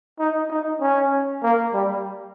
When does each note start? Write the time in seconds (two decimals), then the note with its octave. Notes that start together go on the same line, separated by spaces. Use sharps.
0.19 D#4
0.50 D#4
0.81 C#4
1.43 A#3
1.73 G3